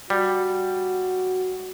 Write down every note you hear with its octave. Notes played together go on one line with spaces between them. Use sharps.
G3 F#4